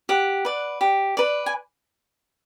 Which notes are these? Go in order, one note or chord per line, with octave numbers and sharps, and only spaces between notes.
G4 F#5
B4 D5
G4
B4 D5
G#5